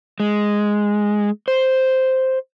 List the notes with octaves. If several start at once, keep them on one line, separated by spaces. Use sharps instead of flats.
G#3
C5